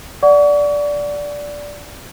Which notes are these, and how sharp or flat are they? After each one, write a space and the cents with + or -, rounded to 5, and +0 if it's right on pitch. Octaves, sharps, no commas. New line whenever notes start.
D5 -10 F#5 +0 C#6 +40